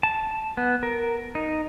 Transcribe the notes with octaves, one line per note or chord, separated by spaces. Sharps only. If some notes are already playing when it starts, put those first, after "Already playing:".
A5
B3
A#4
D#4